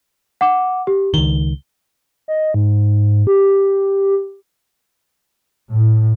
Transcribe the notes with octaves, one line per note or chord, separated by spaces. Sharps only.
F#5 D6
G4
C#2 D#3 G7
D#5
G#2
G4
A2